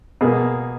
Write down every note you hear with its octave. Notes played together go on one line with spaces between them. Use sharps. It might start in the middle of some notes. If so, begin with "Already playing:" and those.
B2 A#3 G#4